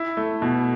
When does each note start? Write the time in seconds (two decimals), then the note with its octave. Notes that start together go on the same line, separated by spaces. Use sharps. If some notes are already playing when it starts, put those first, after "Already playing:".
Already playing: E4
0.17 A3
0.42 B2